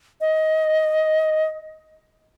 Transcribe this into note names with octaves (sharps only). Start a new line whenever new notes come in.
D#5